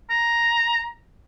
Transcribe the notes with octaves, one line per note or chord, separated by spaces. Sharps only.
A#5